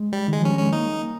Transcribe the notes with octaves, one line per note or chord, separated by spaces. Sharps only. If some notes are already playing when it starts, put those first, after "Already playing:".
Already playing: G#3
G3
D#3 G#3
F3
C#4
G3
G#3 C#4
A#3 D#4